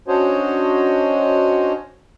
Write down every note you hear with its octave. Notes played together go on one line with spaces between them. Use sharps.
C#4 D4 F#4 C5 C#5 D#5